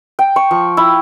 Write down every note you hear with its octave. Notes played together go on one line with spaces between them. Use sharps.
G5
C#6
F3
E4